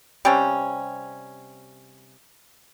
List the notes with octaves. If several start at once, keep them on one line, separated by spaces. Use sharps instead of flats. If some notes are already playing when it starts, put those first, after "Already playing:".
C3 G3 C4 C#4